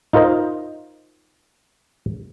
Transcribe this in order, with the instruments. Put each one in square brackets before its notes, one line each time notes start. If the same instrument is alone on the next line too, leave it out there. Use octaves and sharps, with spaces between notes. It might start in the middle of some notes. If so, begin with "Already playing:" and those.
[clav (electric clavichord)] D#4 F4 A#4 C5 D#5